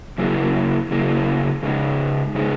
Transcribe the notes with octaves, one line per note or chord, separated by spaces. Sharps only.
C#3 F#3 A#3 E4 G#4
C#3 F#3 A#3 E4 G#4
C#3 G#3 D#4 G#4
C#3 G#3 D#4 G#4